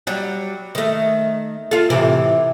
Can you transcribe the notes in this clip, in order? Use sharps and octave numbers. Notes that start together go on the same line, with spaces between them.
F#3 G3
D#3 A3
F4 A4
A2 C3 E3